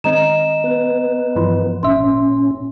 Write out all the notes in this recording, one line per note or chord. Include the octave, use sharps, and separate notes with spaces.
D#3 G#3 C4 D#5 A#5 E7
B3 B4
G2 E3 F3
G#1 A#2 C#4 E5 C6